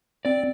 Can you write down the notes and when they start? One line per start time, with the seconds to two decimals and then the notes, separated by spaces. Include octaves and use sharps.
0.25 C4 D5